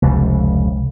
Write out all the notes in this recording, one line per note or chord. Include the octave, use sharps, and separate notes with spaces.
F1 C#2